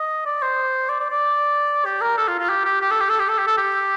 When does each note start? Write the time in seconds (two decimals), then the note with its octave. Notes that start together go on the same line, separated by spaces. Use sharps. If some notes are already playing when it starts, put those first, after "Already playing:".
Already playing: D#5
0.26 D5
0.42 C5
0.89 D5
1.00 D5
1.11 D5
1.85 G4
2.01 A#4
2.18 A4
2.28 F4
2.39 F4
2.49 G4
2.65 G4
2.81 G4
2.91 A4
3.00 G4
3.10 A4
3.19 G4
3.29 A4
3.38 G4
3.47 A4
3.57 G4